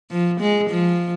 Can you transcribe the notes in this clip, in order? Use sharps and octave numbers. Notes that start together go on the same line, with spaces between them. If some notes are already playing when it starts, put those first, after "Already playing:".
F3
G#3
F3